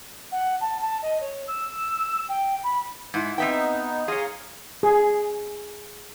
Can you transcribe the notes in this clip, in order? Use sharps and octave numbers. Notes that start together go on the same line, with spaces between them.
F#5
A5
A5
D#5
C#5
E6
G5
B5
G#2 E4
B3 C4 D#4 E5 G5
G#4 C#5 F5 A#5 C6
G#4